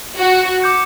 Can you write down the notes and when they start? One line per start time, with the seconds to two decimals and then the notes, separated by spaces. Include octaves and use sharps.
0.18 F#4
0.62 D6 G6 C#7